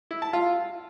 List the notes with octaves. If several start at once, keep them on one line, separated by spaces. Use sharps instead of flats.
E4
A5
F4